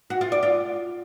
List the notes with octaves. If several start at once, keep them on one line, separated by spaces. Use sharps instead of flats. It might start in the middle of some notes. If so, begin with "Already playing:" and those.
F#4
F4
D5
F4